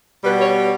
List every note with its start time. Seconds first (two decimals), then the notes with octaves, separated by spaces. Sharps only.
0.22 G3 B4
0.25 B2
0.39 C#5